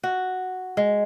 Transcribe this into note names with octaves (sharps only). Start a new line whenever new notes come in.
F#4
G#3